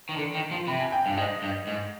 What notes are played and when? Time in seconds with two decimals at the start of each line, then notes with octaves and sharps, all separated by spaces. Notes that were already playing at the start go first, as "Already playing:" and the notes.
0.09 D#3
0.17 D3
0.34 D#3
0.51 F3
0.67 C3 B5
0.80 G#5
0.92 G5
1.05 G2 F5
1.17 G#2 D#5
1.42 G2
1.67 G#2